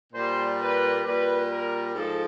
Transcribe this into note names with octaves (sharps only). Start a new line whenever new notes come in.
A#2 G3 C5
B4
A#2 G3 B4
A#4
G#2 F3 A4